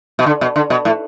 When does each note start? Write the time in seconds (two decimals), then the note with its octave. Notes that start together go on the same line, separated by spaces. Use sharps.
0.19 B2
0.26 D3
0.41 B2
0.56 D3
0.70 B2
0.85 A2